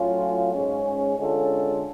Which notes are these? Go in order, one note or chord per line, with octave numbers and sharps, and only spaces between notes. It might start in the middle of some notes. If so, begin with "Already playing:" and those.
Already playing: A2 F#3 C#4 F4
G#2 G#3 C#4
D3 G#3 C#4 F4 A4